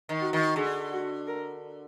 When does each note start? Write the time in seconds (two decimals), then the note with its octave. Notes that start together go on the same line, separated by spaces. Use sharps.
0.09 D#3
0.21 F#4
0.33 D#3
0.56 D3 G#4
0.92 F#4
1.28 A#4